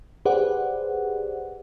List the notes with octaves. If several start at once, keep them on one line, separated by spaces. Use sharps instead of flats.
G4 G#4 B4 C5 D5 F#5